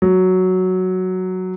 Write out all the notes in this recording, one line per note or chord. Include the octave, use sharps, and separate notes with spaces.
F#3